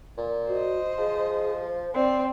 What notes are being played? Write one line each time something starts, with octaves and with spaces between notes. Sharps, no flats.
A#2
F#4 C5 D#5
F3 G#4
C5
C4 D5